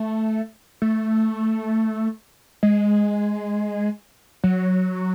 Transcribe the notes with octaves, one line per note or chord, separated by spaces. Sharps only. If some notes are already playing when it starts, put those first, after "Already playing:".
Already playing: A3
A3
G#3
F#3